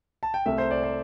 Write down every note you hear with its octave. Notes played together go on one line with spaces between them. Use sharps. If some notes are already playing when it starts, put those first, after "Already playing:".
A5
G5
C2 C3 A3 E5
C5
D5
C5